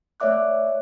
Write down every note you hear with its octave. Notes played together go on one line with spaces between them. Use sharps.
A3 C#5 D5 E5 D6 F#6